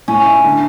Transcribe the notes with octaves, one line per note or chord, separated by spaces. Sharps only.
A2 C#4
E4
D3